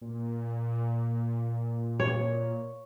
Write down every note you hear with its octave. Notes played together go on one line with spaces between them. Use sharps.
A#2
C#5